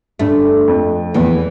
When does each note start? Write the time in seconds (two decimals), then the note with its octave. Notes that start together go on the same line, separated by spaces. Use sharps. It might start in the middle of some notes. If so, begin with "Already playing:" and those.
0.19 G2 A3
0.68 F2
1.14 E2 E3